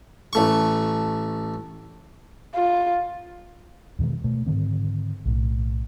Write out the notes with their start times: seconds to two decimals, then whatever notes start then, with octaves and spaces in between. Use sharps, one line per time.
0.33 A1 A3 C#6
2.55 F4
3.99 E2 B2 D#3 G#3
4.24 B2 A3
4.46 G#2 D3 D#3 C4
5.25 B1 A2